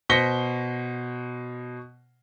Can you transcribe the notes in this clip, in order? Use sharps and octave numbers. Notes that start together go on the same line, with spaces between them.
B2 C5 A#6 B6 C#7 G7